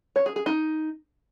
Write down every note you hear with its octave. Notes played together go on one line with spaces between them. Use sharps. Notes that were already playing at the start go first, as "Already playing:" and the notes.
C#5
G#4
G#4
D#4